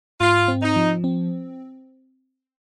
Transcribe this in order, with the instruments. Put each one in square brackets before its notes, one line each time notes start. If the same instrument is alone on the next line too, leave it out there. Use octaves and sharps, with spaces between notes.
[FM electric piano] G#2 [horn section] F4
[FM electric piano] C4
[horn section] D#4
[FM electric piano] F3
C4